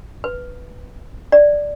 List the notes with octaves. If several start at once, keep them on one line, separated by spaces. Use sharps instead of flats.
B4
D5